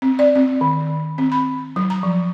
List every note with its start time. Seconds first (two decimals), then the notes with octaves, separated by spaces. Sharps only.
0.02 C4
0.19 D5
0.35 C4
0.61 D#3
1.18 C4
1.32 B5
1.76 F#3
1.90 A#5
2.03 F3